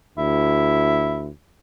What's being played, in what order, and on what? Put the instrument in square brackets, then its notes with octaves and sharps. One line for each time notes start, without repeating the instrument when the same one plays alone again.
[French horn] D2 [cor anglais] E4